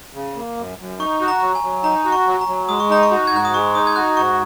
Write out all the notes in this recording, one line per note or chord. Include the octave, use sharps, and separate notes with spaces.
C#3
A#3
F#2
F#2
D#4 C#6
F#4
A#5
F#3
G#5
F#3
D#4 A#5
F#4
C#6
F#3
A#5
F#3
G#3 D#6
C#6
D#4 A#5
C#6
F#4
G#6
G#2 F#6
D#6
G#3 C#6
D#4 D#6
G#6
F#4 F#6
G#2 C#6